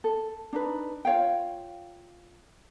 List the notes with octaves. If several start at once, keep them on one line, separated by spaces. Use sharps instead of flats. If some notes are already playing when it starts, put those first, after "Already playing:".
A4
D4 D#4 B4
F4 C#5 F5 G5